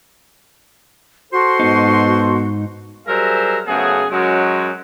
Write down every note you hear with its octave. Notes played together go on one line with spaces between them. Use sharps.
F#4 A4 C5 C6
G#2 B2 D#4
F#3 G3 G#4 A#4 C5 E5
F#2 C#3 A3 B3 G#4
F#2 F#3 G#3